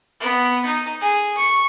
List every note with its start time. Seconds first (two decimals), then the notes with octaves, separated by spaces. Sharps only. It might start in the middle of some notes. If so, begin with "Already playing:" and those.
0.21 B3
0.66 D#4
1.01 G#4
1.38 C#6